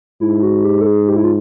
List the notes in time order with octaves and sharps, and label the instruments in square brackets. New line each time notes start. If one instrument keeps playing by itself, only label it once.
[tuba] G#2 [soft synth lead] E4
[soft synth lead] F#4
G4
A4
G#4
G4
E4
F4